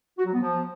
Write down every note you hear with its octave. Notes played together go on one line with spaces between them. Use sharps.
F#4
F#3
B3
F3